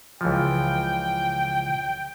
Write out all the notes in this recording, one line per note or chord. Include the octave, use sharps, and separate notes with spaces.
C#2 E3 F3 G5